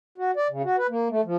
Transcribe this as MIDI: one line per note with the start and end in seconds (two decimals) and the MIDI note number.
0.18 0.31 66
0.36 0.47 74
0.50 0.62 49
0.64 0.76 66
0.77 0.87 71
0.90 1.08 58
1.10 1.21 57
1.25 1.37 53